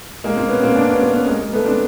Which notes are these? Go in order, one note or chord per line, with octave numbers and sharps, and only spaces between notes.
G#3 A#3
A#3 C4
B3 C#4
A#3 C4
C4 D4
B3 C#4
A#3 C4
B3 C#4
G#3 A#3
G#3 A#3
A3 B3
C4 D4